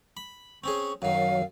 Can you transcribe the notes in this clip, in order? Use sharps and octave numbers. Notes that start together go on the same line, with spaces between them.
B5
C4 C#4 G#4 C#6
F#2 D#3 F#3 F5